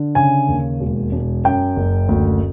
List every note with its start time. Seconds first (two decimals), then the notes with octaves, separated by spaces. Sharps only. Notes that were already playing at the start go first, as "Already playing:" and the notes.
Already playing: D3
0.15 C#3 G#5
0.48 D#2
0.80 E1
1.12 E1
1.45 F#2 G5
1.76 F#1
2.09 D2